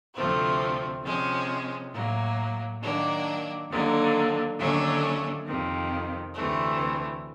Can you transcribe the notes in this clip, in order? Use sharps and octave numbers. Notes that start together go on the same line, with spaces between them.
D2 C3 F3 A3 C4
C3 F3 G#3 C#4
A2 F#3 A#3
D#3 F#3 A#3 D4
D#2 D3 F#3 A#3
D#2 D3 F#3 A3 C#4
F2 C3 D#3
D2 C3 E3 A3